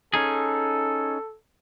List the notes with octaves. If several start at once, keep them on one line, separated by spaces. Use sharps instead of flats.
C#4 D#4 G#4 A4